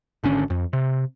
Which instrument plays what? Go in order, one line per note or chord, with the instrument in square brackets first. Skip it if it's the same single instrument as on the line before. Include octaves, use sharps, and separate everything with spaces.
[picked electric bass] G#1 D3 C#4
F2
C3